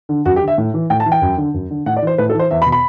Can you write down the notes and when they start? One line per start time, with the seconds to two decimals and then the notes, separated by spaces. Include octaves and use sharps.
0.09 D3
0.25 F#2 F#4
0.36 G4
0.42 D3
0.48 E5
0.58 A2
0.74 E3
0.90 A2 G5
1.00 A5
1.06 E3
1.12 G5
1.22 F#2
1.38 D3
1.54 F#2
1.70 D3
1.86 A2 F#5
1.97 D5
2.02 E3 C5
2.18 A2 B4
2.30 A4
2.34 E3 C5
2.51 E2 E5
2.62 B5
2.67 B2
2.72 B5